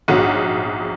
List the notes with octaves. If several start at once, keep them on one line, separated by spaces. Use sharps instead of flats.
A#1 G#2 F#3 F#5